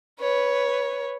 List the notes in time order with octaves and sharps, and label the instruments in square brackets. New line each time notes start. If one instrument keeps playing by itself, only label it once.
[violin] B4 C#5